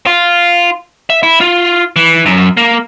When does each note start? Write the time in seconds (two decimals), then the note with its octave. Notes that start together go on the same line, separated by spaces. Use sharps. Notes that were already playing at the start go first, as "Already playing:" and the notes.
0.06 F4
1.10 E5
1.23 E4
1.41 F4
1.96 E3
2.26 F#2
2.57 A#3